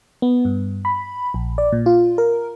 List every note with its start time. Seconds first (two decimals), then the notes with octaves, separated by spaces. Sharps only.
0.22 B3
0.45 G2
0.85 B5
1.34 A#1
1.58 D5
1.72 A#2
1.86 F4
2.18 A#4